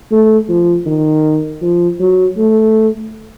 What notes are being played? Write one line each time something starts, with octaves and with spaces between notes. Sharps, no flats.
A3
F3
D#3
F3
F#3
A3